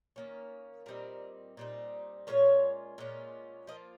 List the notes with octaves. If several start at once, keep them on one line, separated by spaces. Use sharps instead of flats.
D#3 A#3 C#4
A#2 G3 C4 D#4 A#4
A#2 G3 C4 D#4
A#2 G#3 C#4 F4 C#5
A#2 G#3 C#4 F4
F3 A#3 F4 D#5